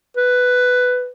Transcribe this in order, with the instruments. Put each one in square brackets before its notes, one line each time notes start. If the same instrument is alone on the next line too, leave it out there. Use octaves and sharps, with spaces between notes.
[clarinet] B4